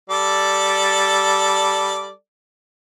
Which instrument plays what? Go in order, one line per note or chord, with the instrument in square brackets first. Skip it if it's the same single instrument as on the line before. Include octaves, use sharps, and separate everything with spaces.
[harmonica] G3 A4 D5